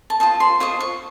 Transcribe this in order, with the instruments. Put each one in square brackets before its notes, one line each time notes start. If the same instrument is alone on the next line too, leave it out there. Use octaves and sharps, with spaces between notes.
[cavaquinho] A5
F4 C5 D#5 A5
C6
F4 C5 D#5 C#6
C#6